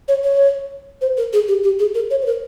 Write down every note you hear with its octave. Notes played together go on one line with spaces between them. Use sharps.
C#5
C#5
C5
A#4
G#4
G4
G4
G#4
A#4
C#5
C5
A#4